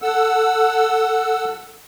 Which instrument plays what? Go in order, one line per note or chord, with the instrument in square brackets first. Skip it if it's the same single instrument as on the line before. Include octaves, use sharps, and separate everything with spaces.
[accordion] A4 F#5 E6